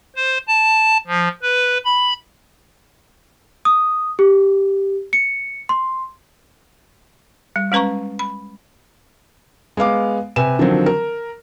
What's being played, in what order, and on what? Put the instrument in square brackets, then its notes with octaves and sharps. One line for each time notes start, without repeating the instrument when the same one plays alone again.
[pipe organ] C5
A5
F3
B4
B5
[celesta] D#6
G4
C#7
C6
[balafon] G3
G#3 C#4 B4 A#5 C#6
B5
[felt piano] G#3 B3 F5 D6
C3 B4 G#5 E7
D3 D#3 F3 F#3 C4
A#4